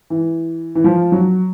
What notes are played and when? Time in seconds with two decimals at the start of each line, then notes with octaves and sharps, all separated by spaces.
0.10 E3
0.75 E3
0.84 F3
1.12 F#3